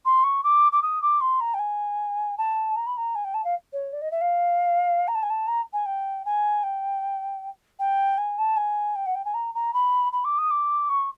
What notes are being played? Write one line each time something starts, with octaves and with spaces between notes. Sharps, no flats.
C6
C#6
D6
D6
D#6
D6
C6
A#5
G5
G#5
A5
A#5
B5
A#5
G#5
G5
A5
F5
C#5
D5
D#5
E5
F5
A#5
A5
G#5
A5
A#5
G#5
G5
G#5
G5
G5
G#5
A5
G#5
G5
F#5
G5
G#5
A#5
A#5
B5
B5
D6
D#6
D6
C#6